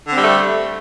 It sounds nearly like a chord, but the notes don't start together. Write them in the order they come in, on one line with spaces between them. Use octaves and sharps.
D3 C4 G3 A3